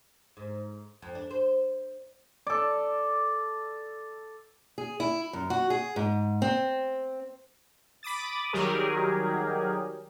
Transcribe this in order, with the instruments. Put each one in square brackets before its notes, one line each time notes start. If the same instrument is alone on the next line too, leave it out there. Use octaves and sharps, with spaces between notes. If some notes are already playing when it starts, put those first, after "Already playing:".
[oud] G#2
F2
D4
C5
[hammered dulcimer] A4 D5
[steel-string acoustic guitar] G#4
E4
F#2
F#4
G#4
G#2
C4
[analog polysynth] B5 D6 D#6 A6
D#3 F#3 G3 G4 G#4 A#4